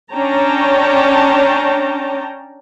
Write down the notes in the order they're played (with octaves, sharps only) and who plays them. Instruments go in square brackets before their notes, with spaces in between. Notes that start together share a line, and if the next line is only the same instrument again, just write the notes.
[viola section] C#4 D4 C#5 G5 A5 A#5